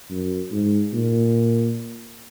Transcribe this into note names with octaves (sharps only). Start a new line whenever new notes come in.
F#2
G#2
A#2